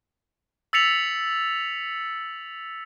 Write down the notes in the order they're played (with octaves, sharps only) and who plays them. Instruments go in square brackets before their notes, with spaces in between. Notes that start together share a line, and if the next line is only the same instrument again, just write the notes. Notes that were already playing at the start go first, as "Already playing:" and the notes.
[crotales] E6 A6 B6 C#7 F7 F#7